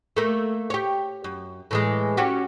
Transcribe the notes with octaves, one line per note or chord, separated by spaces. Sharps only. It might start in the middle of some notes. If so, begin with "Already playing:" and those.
A3 A#3
G4 C#5
F#2
A2 E3 G#3
C#4 F#4 G4